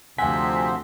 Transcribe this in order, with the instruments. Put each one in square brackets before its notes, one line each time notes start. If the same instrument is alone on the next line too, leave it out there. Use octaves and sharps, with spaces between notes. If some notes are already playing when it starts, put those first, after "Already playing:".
[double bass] D2 [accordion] C3 F3 [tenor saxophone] C4 [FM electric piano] F#5 G#5 B6